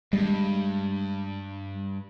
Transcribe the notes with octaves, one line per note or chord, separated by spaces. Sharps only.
G2 G3 G#3